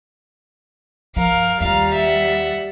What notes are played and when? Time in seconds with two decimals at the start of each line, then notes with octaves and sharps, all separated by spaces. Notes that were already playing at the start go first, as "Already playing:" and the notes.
1.16 G2 F3 A#4 F5
1.60 D#2 G3 F4 F5 A#5
1.95 E5 F#5